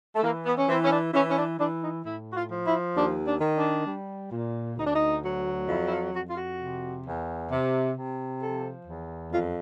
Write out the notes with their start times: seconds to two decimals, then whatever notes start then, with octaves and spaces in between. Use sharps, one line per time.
0.15 A3
0.23 E3 A#3
0.45 B3
0.57 C#4
0.68 E3 C4
0.83 C#4
0.91 D4
1.14 E3 C#4
1.29 C#4
1.36 D4
1.59 E3 D4
1.82 D#4
2.05 A2 E4
2.30 F#4
2.35 F4
2.50 F3
2.65 E4
2.95 D#2 D4
3.26 D4
3.41 D#3
3.56 D4
3.86 G3
4.32 A#2
4.77 D2 D#4
4.85 D4
4.93 D#4
5.23 F#3
5.68 F2 E4
5.86 E4
5.91 F4
6.13 F2 F#4
6.28 F4
6.36 F#4
6.58 C3
7.05 E2
7.50 C3
7.96 C3
8.41 F3 A4
8.86 E2
9.31 F2 F4